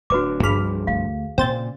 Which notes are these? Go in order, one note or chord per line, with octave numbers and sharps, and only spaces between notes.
D1 D4 F#4 B4 D6
G1 C2 G2 F3 G#4 B5 F6
D2 A3 F5
A#2 C#3 C4 C5 A6